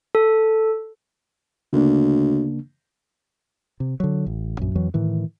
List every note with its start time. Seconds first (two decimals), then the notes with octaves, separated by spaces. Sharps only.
0.15 A4
1.73 D2 C#3 A#3 D4
3.80 C3
4.00 D3 F#3
4.26 A1
4.59 A#1 F#2
4.76 F2 E3 F#3
4.94 A2 D#3 E3